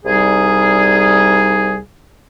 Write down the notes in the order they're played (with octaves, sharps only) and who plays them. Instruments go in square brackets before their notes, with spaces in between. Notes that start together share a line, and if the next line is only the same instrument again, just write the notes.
[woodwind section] C2 G3 D#4 G#4